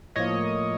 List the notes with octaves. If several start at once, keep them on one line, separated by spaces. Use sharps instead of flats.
A2 F3 A#3 C#5 D#5